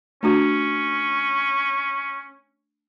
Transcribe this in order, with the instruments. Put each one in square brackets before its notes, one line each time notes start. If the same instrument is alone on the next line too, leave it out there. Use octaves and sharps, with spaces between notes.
[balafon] A3 D4 F#4 [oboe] C#4